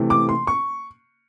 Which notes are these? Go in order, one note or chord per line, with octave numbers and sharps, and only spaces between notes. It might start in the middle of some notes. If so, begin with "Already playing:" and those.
Already playing: C3 E3 A3
D6
C6
C#6